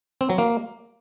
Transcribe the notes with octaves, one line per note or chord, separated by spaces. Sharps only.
C4
F#3
A#3